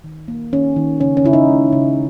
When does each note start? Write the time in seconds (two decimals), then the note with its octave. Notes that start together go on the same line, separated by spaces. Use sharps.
0.04 D#3
0.28 A#3
0.53 D#3 C#4
0.76 D#3
1.01 C#3 C#4
1.17 C#4
1.24 C#3 E4
1.33 D#4
1.49 G#3
1.73 C#3